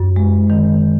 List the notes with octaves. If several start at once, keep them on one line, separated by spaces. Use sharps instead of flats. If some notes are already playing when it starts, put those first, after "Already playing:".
Already playing: F#2
G#3
D#3